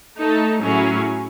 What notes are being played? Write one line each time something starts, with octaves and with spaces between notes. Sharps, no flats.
A3 D#4 A4
A2 F#3 C#4 E4 G#4